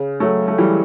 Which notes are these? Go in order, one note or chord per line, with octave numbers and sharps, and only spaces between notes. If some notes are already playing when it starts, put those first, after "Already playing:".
Already playing: C#3
F#3 A3
A3
E3 G3